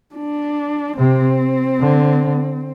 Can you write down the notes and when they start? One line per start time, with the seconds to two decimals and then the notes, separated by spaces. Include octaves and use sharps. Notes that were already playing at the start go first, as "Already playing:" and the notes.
0.15 D4
0.98 C3 C4
1.80 D3